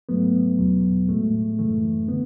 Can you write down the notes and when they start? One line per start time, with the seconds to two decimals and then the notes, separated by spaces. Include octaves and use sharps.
0.09 G#2 F#3 A3 B3
0.59 E2 B2 F#3
1.09 A2 G#3 A3
1.59 F#2 C#3 E3 A3
2.08 D3 B3